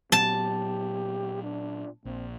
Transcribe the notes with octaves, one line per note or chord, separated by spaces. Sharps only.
A#2 F#3 B3 G4 A5
D4
A#1 C4